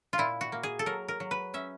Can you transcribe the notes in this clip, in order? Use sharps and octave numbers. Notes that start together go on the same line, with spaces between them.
F4
A#2 E4
F#4
A#3
G#4
A4
F#3 A#4
A#4
F#3
B4
C#4 E5